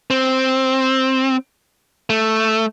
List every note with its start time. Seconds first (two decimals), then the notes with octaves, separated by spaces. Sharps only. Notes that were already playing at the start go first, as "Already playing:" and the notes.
0.10 C4
2.10 A3